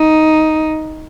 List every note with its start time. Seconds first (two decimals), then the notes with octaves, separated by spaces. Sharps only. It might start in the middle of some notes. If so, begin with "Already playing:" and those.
Already playing: D#4